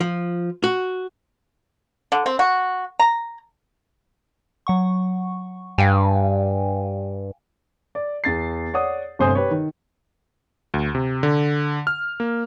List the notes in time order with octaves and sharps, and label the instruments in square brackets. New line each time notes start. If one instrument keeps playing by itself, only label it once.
[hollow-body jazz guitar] F3
F#4
[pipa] D3
C4
F#4
A#5
[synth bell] F#3 F#5 C#6
[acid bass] G2 [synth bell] F5 G5 G#5
[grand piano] D5
E2 A6 C7
C#5 D5 F#5 D#6
G1 C3 A3 C5 G#5 D#6
G4 B4 C#5
D#3
[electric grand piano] D2
C3
D3
F6
A#3